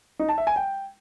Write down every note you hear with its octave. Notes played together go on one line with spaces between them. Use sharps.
D#4
A5
E5
G#5
G5